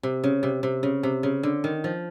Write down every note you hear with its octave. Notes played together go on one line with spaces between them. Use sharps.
C3
C#3
C3
C3
C#3
C3
C#3
D3
D#3
F3